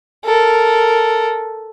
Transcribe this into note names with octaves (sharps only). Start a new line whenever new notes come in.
A4 A#4